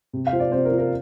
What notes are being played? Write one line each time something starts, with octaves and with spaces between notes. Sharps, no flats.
C3
F5
F3 C5
D5
C3 C5
A#4
F3
A#4